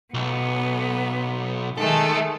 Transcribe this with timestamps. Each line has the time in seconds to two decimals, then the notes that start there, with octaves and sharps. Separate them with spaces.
0.14 B1 B3
1.78 D#3 G#3 A3 A4